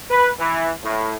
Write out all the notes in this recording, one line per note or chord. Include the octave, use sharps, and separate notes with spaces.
B4
E3
A2